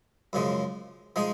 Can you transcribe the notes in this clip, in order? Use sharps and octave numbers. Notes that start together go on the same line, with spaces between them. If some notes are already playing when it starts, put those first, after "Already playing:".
F#2 C#3 F3 G#3
F3 G#3 D#4 G#4